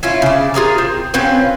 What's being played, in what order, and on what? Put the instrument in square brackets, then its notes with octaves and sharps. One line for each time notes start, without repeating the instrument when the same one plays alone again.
[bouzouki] C#4 E4 F4
C#3 D4
F4 G#4 A#4 A#5
C4
C4 C#4 F4 B4